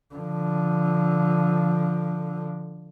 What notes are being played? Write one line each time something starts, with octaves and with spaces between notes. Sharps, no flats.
D3 F3